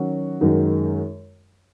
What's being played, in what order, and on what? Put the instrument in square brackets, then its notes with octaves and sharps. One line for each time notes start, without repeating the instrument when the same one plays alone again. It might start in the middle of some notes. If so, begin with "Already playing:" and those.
Already playing: [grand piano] D#3 F#3 C#4 F#4
F#2 D#3 G#3 D#4 F#4